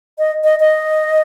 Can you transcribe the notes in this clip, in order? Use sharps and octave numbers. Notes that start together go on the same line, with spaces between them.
D#5
D#5
D#5